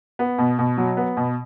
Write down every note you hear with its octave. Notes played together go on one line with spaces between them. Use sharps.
B3
B2
B2
F#3
B3
B2